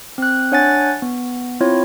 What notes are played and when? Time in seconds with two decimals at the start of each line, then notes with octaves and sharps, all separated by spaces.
0.18 C4 F#6
0.52 D4 C#5 F#5 G#5 F#6 A6
1.02 B3
1.60 C4 E4 F4 C#5